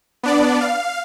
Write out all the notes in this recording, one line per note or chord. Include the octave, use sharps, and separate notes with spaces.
B3 D4 D5
F5